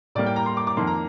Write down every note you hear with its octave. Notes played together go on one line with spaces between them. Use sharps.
A2 G3 A#3 D5
G5
A#5
C6
D6
D6
F2 D#3 A#3 C6
A#5